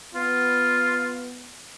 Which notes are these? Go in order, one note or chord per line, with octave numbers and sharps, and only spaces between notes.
B3 F4